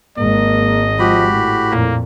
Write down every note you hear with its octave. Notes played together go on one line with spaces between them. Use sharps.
G#1 G#3 A#3 D#5
F3 F#4 G4 B5
A2
F2 A#2 A#3